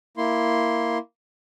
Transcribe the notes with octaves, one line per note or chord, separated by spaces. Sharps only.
A#3 E4 C6